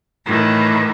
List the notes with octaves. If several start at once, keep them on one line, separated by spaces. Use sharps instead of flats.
A2 D#3 E3